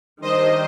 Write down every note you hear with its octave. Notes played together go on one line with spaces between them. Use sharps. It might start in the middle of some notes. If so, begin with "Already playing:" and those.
D#3 G3 D4 G4 C5 D#5